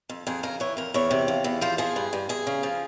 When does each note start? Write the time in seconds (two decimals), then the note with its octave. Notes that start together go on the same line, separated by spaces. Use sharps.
0.09 F2
0.27 F2 G#4
0.43 C#3 A#4
0.60 E3 C#5
0.77 F2 A#4
0.94 E2 C#5
1.11 C3
1.28 F3
1.44 E2
1.61 F3 C5
1.78 F3 G#4
1.96 G2
2.13 G2
2.29 E2 G#4
2.47 C#3
2.63 F3